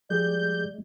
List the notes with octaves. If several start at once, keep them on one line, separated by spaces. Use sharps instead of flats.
F3 G#3 G4 G#4 D5 G6